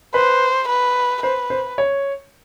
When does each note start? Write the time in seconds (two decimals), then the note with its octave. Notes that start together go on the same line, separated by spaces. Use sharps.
0.14 B4 C5
0.68 B4
1.23 B4 C5
1.50 C5
1.78 C#5